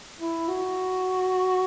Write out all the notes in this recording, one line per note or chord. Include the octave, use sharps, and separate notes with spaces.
E4
F#4